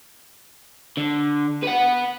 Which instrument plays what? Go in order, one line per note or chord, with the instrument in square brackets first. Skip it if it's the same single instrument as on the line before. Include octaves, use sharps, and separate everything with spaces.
[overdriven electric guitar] D3
B4 F#5